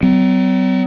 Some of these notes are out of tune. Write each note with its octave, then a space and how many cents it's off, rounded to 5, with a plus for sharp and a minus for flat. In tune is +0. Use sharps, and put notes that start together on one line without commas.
F#3 +35 C4 -45